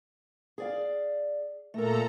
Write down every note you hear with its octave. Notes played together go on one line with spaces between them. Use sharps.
G#4 D5 F5
A#2 A3 A4 A#4 A#5